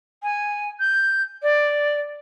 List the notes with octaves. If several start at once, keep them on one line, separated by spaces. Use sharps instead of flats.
G#5
G6
D5